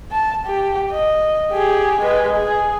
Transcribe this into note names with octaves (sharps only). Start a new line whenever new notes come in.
A5
G4
D#5
G4 G#4
G#3 B4
G#4